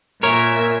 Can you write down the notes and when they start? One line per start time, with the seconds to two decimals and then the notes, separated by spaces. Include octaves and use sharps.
0.23 A#2 A#4 C#5 E5 G#5